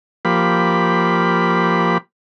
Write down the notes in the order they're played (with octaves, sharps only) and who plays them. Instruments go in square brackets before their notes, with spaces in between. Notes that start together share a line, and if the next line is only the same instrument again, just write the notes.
[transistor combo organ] F3 A#3 G4 B5